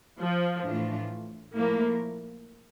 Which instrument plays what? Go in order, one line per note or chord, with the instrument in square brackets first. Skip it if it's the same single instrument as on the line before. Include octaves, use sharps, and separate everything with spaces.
[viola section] F3
[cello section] A2 E3 A3 D4 F4
[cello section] A#2 F3 A3 E4 A#4 [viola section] A#3